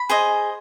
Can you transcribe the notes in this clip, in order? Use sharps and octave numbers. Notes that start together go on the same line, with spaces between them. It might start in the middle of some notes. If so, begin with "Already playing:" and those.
Already playing: B5
G#4 C5 D#5